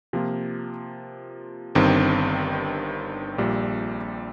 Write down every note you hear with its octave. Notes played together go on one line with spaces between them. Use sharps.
C3 F3 A#3 F4
G1 G2 D#3 C4
A#1 A#2 G3